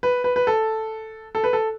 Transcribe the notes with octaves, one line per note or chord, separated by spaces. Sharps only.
B4
B4
B4
A4
A4
B4
A4